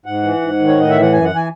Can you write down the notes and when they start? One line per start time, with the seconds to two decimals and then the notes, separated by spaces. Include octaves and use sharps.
0.06 G#2 F#5
0.23 E3
0.41 G#2
0.59 D#3
0.68 C#5
0.77 A2 D#5
0.90 E3 E5
1.01 F#5
1.12 F#2 G#5
1.24 F#5
1.30 E3
1.36 G#5